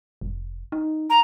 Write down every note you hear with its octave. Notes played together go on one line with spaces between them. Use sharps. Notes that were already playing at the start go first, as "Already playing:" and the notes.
F1
D#4
A#5